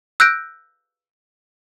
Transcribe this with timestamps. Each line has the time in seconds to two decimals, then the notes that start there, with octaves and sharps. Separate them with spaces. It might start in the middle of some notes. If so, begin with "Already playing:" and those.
0.20 E6 F#6 G6 A#6 D7